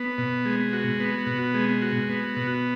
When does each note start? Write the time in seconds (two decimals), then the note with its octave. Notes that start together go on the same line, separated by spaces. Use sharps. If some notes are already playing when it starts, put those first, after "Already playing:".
Already playing: B3
0.18 B2
0.45 G#3
0.73 F#4
1.00 B3
1.27 B2
1.54 G#3
1.82 F#4
2.09 B3
2.36 B2